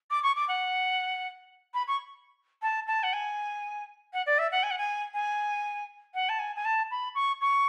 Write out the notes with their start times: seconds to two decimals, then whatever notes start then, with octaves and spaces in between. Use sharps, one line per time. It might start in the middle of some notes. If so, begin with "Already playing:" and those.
0.10 D6
0.23 C#6
0.36 D6
0.47 F#5
1.73 B5
1.87 C#6
2.62 A5
2.86 A5
3.03 F#5
3.12 G#5
4.13 F#5
4.26 D5
4.38 E5
4.51 F#5
4.62 G#5
4.70 F#5
4.77 G#5
5.13 G#5
6.14 F#5
6.28 A5
6.39 G#5
6.55 G#5
6.64 A5
6.90 B5
7.14 C#6
7.40 C#6